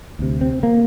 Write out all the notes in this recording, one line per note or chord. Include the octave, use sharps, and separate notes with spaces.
D2 C3
C4
A#3